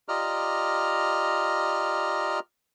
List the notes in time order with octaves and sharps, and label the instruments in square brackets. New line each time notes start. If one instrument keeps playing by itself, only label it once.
[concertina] F4 G4 D5 D#5 A#5 F6